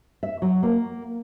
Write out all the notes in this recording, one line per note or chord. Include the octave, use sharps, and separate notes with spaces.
E5
F#3
A#3